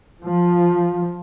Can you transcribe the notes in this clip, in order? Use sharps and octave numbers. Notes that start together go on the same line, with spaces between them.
F3